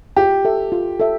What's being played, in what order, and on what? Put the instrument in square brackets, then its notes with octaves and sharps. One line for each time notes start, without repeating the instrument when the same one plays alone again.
[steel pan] F4 [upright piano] G4
[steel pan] A4 E5
F4
A4 E5